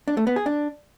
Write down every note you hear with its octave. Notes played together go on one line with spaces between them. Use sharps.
D4
A3
B3
G#4
D4